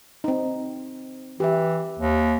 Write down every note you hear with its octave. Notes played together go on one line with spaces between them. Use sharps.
C4 D#4
E3 G4 E5
D#2